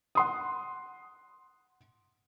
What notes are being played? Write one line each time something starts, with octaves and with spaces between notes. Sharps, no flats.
F#5 C6 D#6